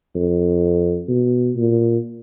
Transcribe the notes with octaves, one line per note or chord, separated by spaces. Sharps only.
F2
B2
A#2